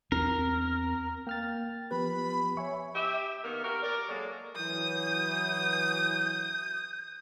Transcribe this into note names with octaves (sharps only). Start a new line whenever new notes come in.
E2 C4 A#4
A#3 G5 F6 A6
F3 B3 G4 B4 B5
C#5 E5 G#5 C#6
G4 E5
D#3 A#3 B3 A#4
F#4 G4 A#4
A#4 D5
F#3 G#3 A#3 A4 D5
E3 F#3 D#6 G6